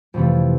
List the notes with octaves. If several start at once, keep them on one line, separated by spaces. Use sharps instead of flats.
F2 C3 E3 A3